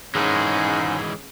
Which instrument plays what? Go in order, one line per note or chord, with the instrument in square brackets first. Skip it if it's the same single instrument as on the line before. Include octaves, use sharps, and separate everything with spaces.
[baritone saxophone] G#2 [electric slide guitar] D#3 E3 G#3 [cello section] C#4 G#4 C#5